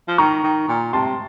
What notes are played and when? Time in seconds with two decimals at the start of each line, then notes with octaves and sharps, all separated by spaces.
0.08 F3
0.18 D#3 A#5 C#6
0.43 D#3
0.68 A#2
0.93 C3 A5 C6